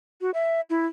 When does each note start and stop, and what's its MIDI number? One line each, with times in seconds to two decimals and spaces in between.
0.21 0.31 66
0.34 0.61 76
0.70 0.86 64